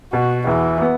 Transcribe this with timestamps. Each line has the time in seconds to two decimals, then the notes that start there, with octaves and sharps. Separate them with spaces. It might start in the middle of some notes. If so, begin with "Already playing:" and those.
0.13 B2 F#4
0.47 E2 E3
0.81 B3